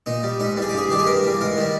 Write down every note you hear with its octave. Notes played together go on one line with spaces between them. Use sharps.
A#2 D#4
G3
G#2 D#4
E3 G3
G#4
G4
G2 G#4
D#3 G3 G4
G#4
G2 A#4
E3 G3
G#2 A#4
D#3 G3